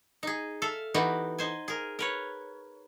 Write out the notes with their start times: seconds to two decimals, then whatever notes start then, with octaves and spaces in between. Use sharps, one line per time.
0.23 D#4 G#4
0.62 A4 E5 F5
0.94 E3 B3 D#4 F#4 G4 B4
1.38 D#4 C5 G#5
1.68 G#4 A#4
1.99 A#4 B4 C#5